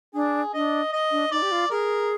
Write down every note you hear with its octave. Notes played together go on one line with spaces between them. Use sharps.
D4 G#4
D4 D#5
D#5
D4
D#4 D5
G4
F4
G#4 A#4